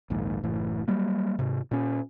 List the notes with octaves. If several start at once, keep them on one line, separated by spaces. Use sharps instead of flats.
A#1 D#2 G#2
F#1 A2 E3
F#3 G3 A#3
G#2 C3
A#2 C#4